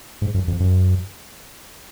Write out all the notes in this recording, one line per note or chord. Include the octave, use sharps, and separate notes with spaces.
G#2
F#2
F2
F#2